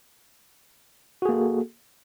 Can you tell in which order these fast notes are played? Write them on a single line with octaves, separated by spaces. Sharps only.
F#4 G#4 A#3 A4